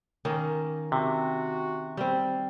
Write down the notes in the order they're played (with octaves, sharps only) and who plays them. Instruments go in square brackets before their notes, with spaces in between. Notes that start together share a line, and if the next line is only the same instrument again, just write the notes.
[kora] D#3 A#3 C#4
[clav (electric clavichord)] C3 [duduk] F#4
[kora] G3 C4